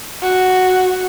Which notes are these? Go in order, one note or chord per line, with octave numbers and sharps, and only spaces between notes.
F#4